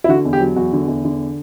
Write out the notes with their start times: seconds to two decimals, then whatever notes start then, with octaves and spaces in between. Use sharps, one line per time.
0.04 E4
0.08 D3 F#4
0.25 E2
0.33 G4
0.40 F#3
0.56 E2 F#4
0.73 D3
0.88 E2
1.05 D3